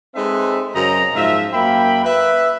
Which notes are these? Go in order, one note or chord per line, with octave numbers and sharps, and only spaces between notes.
G#3 C4 D#4 A4 B4 E5
F#2 C#3 C4 D#5 A#5
G#2 F3 F4 E5
F#2 A#3 E5 G5 B5
B4 E5